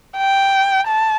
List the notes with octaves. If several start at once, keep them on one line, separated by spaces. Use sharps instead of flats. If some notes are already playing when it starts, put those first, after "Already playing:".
G5
A5